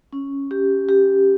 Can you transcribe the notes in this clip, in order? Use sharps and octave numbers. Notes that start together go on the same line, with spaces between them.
C#4
G4
G4